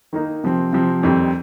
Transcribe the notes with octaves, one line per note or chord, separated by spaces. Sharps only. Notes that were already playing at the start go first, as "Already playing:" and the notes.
D#3 A#3 D#4
C3 F3 C4
C3 F3 C4
F2 D#3 G3 C4 D#4